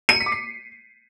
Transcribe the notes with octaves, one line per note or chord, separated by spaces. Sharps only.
D#7
C#7
B6
D6
C7